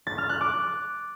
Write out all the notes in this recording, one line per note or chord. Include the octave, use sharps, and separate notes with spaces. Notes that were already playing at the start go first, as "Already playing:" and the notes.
A6
F6
F#6
D6